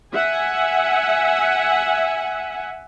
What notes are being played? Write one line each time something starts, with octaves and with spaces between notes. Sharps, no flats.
E5 F#5 G#5